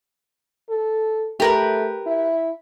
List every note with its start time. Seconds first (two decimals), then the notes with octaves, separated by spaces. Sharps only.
0.70 A4
1.40 A3 G4 A#4 B4
2.07 E4